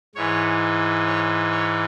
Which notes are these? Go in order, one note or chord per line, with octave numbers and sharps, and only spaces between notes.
G#2 E3 C#5
C#5
C#5